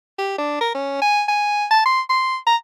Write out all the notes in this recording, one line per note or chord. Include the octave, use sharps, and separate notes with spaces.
G4
D4
A#4
C#4
G#5
G#5
A5
C6
C6
A#5